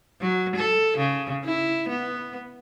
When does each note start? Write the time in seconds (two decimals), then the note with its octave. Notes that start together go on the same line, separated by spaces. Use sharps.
0.21 F#3
0.56 A4
0.97 C#3
1.45 E4
1.89 B3